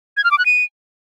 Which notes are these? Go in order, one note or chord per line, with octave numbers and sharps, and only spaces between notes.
G#6
F6
D6
F#6
D#7